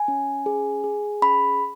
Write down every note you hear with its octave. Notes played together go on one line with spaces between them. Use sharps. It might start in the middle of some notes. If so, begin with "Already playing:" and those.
Already playing: G#5
C#4
G#4
G#4
C#4 B5